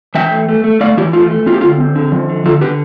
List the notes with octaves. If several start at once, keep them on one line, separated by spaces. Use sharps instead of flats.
E3 E5 G5
A3
A3
A3
A3 D5 F5
E3 E4 G4
A3 F4
A3
C4 F4
G4
F4
D3
C4
D3
F3
D3
D3 F4 A4
D3 G4 B4